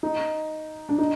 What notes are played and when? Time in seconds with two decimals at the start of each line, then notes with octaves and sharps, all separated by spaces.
0.03 D#4
0.89 D4
0.98 D#4